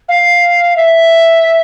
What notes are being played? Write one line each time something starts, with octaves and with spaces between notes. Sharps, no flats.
F5
E5